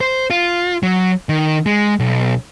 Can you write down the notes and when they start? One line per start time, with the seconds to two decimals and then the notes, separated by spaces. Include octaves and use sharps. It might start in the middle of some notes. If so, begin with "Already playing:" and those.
0.01 C5
0.30 F4
0.83 F#3
1.29 D#3
1.66 G#3
1.99 B1